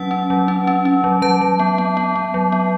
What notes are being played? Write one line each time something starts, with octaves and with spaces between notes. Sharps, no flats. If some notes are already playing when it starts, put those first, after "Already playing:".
Already playing: F#3 C#4 F#5
C#4
F#3
C#4
C#4
C#4
F#3
F#3 A5
F#3
B3
B3
B3
B3
F#3
B3